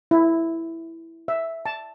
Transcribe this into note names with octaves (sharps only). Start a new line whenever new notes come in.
E4
E5
A5